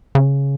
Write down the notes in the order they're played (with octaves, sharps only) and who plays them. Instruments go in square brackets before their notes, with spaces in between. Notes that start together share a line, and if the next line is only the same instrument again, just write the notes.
[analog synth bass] C#3